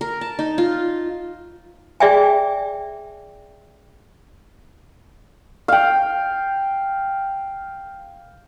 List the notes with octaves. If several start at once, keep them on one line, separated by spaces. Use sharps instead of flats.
A#4
A5
D#4
F4
G#4 D5 E5 G5 G#5
F5 G5